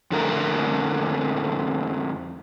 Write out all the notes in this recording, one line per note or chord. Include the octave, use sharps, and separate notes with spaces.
F2 D3 A3 A#4